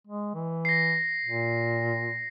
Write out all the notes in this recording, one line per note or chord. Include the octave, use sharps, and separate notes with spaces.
G#3
E3
A#6 C7
A#2